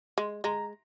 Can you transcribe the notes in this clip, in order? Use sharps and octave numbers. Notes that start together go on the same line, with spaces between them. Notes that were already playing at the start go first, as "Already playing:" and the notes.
G#3
G#3 A#5